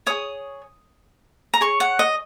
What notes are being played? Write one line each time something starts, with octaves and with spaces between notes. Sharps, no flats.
G#4 C#5 D#6
A#5
G#4 C#5 C#6
F#5
D#5